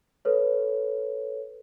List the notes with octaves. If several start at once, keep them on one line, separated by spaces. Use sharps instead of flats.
A4 B4 C#5